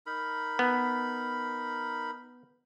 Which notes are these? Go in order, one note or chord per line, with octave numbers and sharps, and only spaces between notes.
D#4 A#4 B5
B3